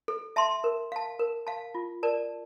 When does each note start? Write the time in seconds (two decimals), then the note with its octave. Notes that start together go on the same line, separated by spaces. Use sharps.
0.08 A4
0.36 E5 A5 C6
0.64 A#4
0.92 F5 A5
1.19 A#4
1.47 F5 A5
1.75 F4
2.03 A#4 D5 A5